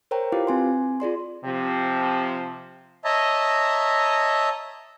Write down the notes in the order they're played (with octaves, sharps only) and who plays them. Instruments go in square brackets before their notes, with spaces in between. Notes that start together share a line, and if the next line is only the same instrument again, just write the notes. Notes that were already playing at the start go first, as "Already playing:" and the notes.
[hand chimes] A#4 C5 C#5 G5 A#5
E4 F4 G4 B4 F5 D6
C4 G#5 C6
F4 G#4 D5 C6
[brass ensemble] C3 F3
[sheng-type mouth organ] C#5 D#5 E5 A5 A#5